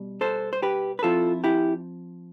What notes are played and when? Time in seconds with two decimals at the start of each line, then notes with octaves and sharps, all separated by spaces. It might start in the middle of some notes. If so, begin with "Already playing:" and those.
Already playing: B2 G3
0.21 A4 C5
0.53 C5
0.62 G4 B4
0.99 B4
1.03 F3 C4 E4 F4 A4
1.44 E4 G4